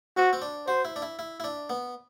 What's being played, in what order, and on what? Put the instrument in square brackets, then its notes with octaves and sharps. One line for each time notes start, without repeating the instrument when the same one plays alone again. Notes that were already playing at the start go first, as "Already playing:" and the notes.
[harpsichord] C4 [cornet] F#4
[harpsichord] C4
D4
[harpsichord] F#4 [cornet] C5
[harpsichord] E4
D4
E4
E4
E4
D4
B3